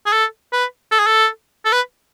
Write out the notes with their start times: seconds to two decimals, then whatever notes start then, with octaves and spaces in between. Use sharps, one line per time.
0.06 G#4
0.12 A4
0.53 B4
0.92 A4
0.99 G#4
1.07 A4
1.65 A4
1.73 B4